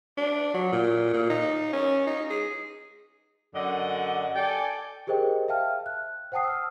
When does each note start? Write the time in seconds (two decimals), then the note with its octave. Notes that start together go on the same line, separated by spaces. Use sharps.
0.17 D4
0.54 F#3
0.72 A#2
1.13 A#2
1.30 D#4
1.73 C#4
2.07 D#4
2.30 G#4
3.55 F#2 D3 D5 D#5 F#5
4.36 A4 D5 G5 G#5
5.07 G4 G#4 A#4 C5 D#5 G5
5.48 E5 F5 G5 A5 F6
5.86 F#6
6.32 C5 F#5 G5 A5 D#6 C7
6.44 E6 F6